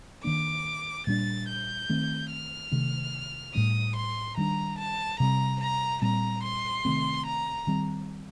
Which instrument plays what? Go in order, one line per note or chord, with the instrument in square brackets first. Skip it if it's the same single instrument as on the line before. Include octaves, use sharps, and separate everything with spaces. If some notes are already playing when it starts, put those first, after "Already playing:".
[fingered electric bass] D#3 A#3 D4 [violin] D6
[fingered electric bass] A#2 G3 D4 [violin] A6
[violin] G6
[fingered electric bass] D#3 A3 C4
[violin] F6
[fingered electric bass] C3 D#3 A3
[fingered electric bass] A2 G3 D4 [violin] D#6
[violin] C6
[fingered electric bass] D#3 G3 D4 [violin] A#5
[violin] A5
[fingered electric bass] C3 G3 C4 [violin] A#5
[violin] A#5
[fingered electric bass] A#2 G3 C4 [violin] A#5
[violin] C6
[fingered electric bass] C3 D#3 A3 C4
[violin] A#5
[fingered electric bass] D#3 G3 C4